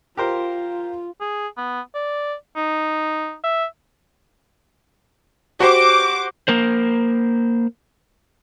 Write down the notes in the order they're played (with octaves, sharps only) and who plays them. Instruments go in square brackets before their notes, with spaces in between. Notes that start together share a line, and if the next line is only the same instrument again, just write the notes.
[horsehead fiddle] F4 [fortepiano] G4 A#4 C5
[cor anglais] G#4
B3
D5
D#4
E5
[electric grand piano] F#4 G4 C5 [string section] D6
[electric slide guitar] A#3 A#4 C5